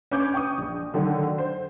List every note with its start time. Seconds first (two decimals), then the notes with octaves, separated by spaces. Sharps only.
0.11 C#4 B4 D6 G6
0.34 G5 C#6 D#6
0.58 A#1
0.94 D3 D#3 F#3 A3
1.38 C5